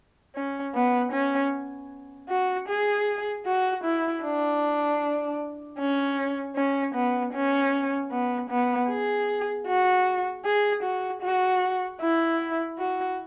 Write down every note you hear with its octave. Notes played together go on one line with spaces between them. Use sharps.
C#4
B3
C#4
F#4
G#4
F#4
E4
D4
C#4
C#4
B3
C#4
B3
B3
G#4
F#4
G#4
F#4
F#4
E4
F#4